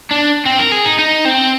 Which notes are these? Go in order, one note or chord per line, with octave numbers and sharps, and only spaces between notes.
D4
C4
A#4
G#4
D#4
D#4
C4